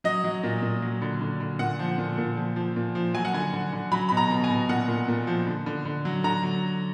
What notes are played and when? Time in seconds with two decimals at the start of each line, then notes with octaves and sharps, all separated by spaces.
0.04 F#3 D#5
0.24 F#3
0.43 A#2
0.62 A#2
0.82 F#3
1.02 D3
1.21 D3
1.40 D3
1.59 A#2 F#5
1.79 F3
1.98 A#2
2.18 A#2
2.37 F3
2.56 F3
2.76 A#2
2.95 F3
3.14 F#3 G#5
3.25 F#5
3.33 D3 G#5
3.53 D3
3.73 D3
3.92 F#3 B5
4.09 B5
4.12 B2
4.17 A#5
4.30 B2
4.44 G#5
4.50 B2
4.69 A#2 F#5
4.88 A#2
5.08 A#2
5.27 F3
5.47 D3
5.66 D3
5.85 D3
6.05 F#3
6.24 D3 A#5
6.43 F#3